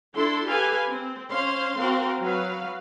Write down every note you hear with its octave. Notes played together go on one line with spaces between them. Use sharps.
D4 E4 A4 C6
G4 A4 B4 F5 G#5
C4
C#4 C5 F5 C6
C4 F#4 A#4 F5
F#3 B4 F5